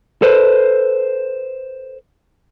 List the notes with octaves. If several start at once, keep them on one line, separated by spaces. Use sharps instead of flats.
A4 B4 C5